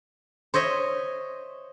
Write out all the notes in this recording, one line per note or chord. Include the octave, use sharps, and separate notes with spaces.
C5 C#5 D#5 E5